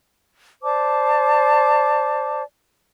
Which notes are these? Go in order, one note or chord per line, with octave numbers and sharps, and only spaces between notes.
C5 D5 A5 D6